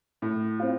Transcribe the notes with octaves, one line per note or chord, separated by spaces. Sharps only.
A2
C4 F4